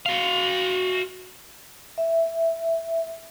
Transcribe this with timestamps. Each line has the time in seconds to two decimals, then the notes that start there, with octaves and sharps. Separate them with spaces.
0.06 F#4 F5
1.98 E5